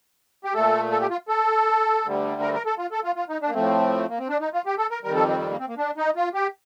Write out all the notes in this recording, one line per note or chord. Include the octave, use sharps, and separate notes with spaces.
G4
A#2 A3 A4
A4
G4
F4
A4
D2 D3 G3
A#4
A#4
A4
F4
A4
F4
F4
D#4
D4
A#3
A2 F3 A3 C4
A#3
C4
D4
D#4
F4
G4
A4
A#4
F2 D#3 G3 A#4
A4
C4
C4
A#3
C4
A#3
D4
D#4
F4
G4